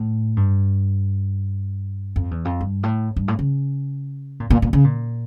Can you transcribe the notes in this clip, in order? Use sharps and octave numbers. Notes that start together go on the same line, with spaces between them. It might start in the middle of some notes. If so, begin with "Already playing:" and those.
Already playing: A2
G2
F2
E2
F2
G2
A2
G2
A2
C#3
A#2
A#2
A#2
C#3
A#2